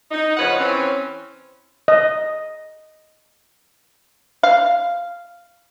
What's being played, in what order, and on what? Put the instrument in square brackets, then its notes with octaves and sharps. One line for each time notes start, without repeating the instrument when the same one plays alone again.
[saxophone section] D#4
C#3 F3 B4 C#5 F#5
E3 C4 C#4
[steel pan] D#5
[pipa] F5